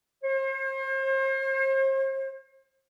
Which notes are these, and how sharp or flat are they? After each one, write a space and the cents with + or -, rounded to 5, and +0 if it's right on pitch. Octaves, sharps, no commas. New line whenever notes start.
C5 +40